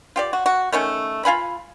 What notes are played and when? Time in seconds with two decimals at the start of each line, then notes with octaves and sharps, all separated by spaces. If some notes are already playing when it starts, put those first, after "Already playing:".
0.16 F4 G4 D5
0.33 F#4
0.46 F#4
0.72 D#3 A3 C#4
1.25 F4 F5 G#5 B5